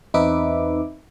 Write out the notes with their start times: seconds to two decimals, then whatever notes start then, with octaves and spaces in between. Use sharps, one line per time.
0.14 E2 C4 D#4 B4 E5 D6